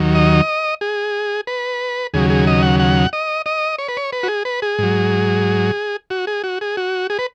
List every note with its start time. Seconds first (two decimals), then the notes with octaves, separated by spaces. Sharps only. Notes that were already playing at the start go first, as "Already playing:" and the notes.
Already playing: D#2 D#3 F#3
0.15 D#5
0.81 G#4
1.47 B4
2.14 D#2 C#3 F#3 G#4
2.30 G#4
2.47 D#5
2.63 F#5
2.80 F#5
3.13 D#5
3.46 D#5
3.79 C#5
3.88 B4
3.97 C#5
4.13 B4
4.23 F#4
4.28 G#4
4.45 B4
4.62 G#4
4.79 G#2 F#3
6.10 F#4
6.27 G#4
6.44 F#4
6.61 G#4
6.77 F#4
7.10 G#4
7.19 B4